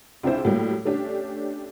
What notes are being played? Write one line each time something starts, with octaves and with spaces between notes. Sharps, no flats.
C#2 C3 D4 E4 C5
A2 F#3 G3 A#3
A3 C#4 D4 G4